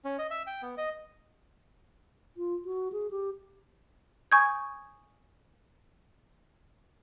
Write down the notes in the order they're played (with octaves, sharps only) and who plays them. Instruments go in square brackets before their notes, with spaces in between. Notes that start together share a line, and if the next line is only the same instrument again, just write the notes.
[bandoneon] C#4
D#5
E5
G5
B3
D#5
[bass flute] F4
F#4
G#4
G4
[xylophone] G#5 C#6 D#6 G6 G#6